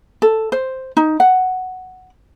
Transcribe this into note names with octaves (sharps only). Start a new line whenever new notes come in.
A4
C5
D#4
F#5